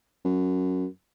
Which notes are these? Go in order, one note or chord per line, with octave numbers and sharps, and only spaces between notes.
F#2